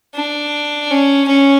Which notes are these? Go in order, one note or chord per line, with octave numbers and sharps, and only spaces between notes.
D4
C#4
C#4